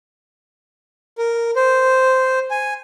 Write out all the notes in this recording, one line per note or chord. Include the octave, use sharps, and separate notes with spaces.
A#4
C5
G#5